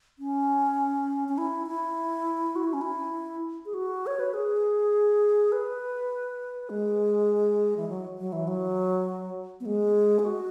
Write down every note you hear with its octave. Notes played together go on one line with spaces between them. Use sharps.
C#4
C#4
E4
E4
F#4
E4
C#4
E4
G#4
F#4
C#5
B4
G#4
B4
G#3
E3
F#3
F#3
E3
F#3
B3
G#3
G#4
F#4